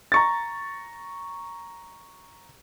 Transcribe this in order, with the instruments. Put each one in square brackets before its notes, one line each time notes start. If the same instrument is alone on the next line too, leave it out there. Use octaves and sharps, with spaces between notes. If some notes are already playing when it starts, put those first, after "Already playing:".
[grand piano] A#5 C#6 A6